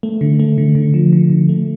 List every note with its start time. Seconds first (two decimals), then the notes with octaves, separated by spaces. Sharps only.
0.03 A3
0.21 D3
0.40 A3
0.58 D3
0.75 D3
0.94 F3
1.13 D3
1.30 D3
1.49 A3